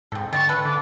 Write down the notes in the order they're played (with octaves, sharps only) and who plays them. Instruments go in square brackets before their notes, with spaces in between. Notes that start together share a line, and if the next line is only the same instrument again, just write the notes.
[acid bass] G#2 [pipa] C4 A4
[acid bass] D3 [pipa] C4 D#5 C#6 [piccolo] A6
[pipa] A3 A4 B4 [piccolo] F#6
[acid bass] D3 [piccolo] D6